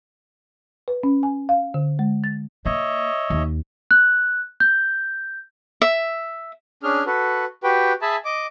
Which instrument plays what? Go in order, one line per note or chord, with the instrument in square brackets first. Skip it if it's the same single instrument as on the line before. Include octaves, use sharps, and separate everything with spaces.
[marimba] B4
C#4
G#5
F5
D3
G#3
A6
[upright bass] A#3 [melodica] C#5 D#5 E5
[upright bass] D#2
[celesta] F#6
G6
[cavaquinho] E5
[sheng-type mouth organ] C#4 D4 G#4 F6
F#4 A4 B4
F#4 G4 B4 G5
G#4 E5 G#5 A5 B5
D#5 D6